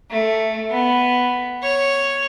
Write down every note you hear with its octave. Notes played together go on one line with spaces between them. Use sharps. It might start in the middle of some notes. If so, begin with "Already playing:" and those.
A3
B3
C#5